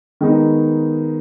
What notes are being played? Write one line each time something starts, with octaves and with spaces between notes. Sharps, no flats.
D#3 G#3 B3 D#4